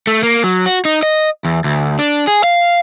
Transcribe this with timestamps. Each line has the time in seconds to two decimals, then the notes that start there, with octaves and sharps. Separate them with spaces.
0.07 A3
0.23 A#3
0.44 F#3
0.66 F#4
0.85 D#4
1.03 D#5
1.45 E2
1.64 D2
1.99 D4
2.27 G#4
2.44 F5